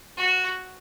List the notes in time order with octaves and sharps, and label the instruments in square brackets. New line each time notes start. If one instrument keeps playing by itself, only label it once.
[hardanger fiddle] F#4